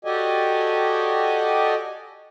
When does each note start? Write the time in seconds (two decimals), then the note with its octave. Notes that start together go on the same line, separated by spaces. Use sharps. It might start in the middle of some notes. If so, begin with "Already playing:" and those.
0.05 F#4 G4 A4 D5 D#5 G#5